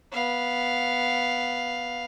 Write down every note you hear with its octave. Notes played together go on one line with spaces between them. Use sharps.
B3 F5